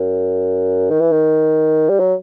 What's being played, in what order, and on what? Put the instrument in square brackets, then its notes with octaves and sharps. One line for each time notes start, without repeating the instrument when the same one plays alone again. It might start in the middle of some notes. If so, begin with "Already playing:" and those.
Already playing: [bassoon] F#2
D#3
E3
D#3
G3
F#3